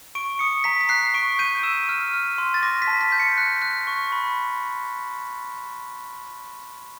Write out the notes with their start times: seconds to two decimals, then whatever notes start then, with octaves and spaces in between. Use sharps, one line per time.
0.15 C#6 D7
0.39 D#6 C#7
0.64 A#5 B6
0.81 B6
0.89 F#6 C7
1.14 C#6 D7
1.39 G6 D#7
1.63 E6 E7
1.88 F6 D#7
2.14 F6
2.38 C6
2.54 A6
2.62 D6 A#6
2.82 B6
2.87 A5
3.01 B6
3.12 G6
3.19 C#7
3.37 F#6
3.62 F#6
3.87 C#6
4.12 B5